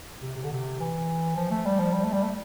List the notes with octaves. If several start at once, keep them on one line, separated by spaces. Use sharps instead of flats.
C3
C3
D3
C3
E3
F3
A3
G3
F3
G3
A3
G3
A3